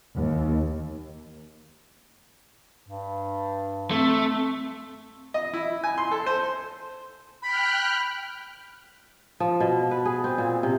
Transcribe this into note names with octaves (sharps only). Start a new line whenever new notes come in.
D#2
G2
A3 C4
D#5
E4
G#5
C6
A4
C5
G5 B5 F6 F#6
F3
B2
B4
G#4
C4
A#2
C3